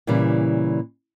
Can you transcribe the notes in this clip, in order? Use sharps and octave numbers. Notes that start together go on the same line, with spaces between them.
A#2 C#3 E3 G3